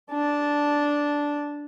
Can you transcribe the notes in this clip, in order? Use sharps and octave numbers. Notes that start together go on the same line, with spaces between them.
D4 A5